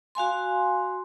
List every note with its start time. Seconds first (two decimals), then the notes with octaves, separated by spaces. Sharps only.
0.15 F#4 F5 G#5 C6